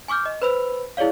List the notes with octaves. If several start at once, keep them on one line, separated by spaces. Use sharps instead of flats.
G#5 C#6 D6 F6 G6
D#5
B4 C5 B5 E6 F7
E4 G#4 C#5 D5 F5